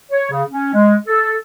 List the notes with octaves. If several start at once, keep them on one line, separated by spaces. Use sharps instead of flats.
C#5
C#3
C#4
G#3
A4